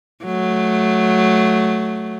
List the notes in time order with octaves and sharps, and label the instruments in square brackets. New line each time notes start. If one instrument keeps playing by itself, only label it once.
[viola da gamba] F#3 A3